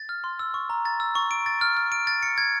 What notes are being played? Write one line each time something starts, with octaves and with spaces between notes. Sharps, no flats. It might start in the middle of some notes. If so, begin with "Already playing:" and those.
Already playing: A6
F6
C6
E6
C#6
A#5
A6
E6
C#6
D7
A6
F6
F6
D7
A6
C#7
G#6